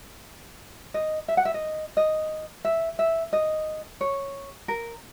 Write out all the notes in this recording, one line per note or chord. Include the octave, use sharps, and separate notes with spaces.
D#5
E5
F#5
E5
D#5
D#5
E5
E5
D#5
C#5
A#4